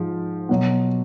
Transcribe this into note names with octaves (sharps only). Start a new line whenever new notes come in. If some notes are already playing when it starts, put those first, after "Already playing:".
Already playing: G#2 F3 G#3
B2 F#3